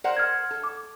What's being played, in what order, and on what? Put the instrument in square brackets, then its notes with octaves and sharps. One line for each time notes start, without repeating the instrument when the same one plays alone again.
[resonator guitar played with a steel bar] A#4 C5 F#5 [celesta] D5
[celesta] F6 G#6
[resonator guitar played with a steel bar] A4
[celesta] D6